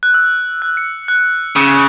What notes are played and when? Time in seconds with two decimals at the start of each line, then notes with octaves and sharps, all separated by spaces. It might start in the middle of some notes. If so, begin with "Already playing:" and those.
0.03 F#6
0.14 E6
0.62 F#6
0.77 C#7
1.08 F#6
1.56 C#3 E6